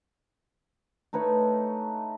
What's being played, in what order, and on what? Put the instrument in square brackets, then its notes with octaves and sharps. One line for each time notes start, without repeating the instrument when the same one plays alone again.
[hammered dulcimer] A3 D#4 B4 C#5